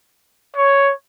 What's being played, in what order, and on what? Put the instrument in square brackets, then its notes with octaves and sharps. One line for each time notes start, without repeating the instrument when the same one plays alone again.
[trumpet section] C#5